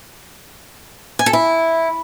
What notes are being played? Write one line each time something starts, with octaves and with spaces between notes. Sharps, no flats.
G#5
A4
E4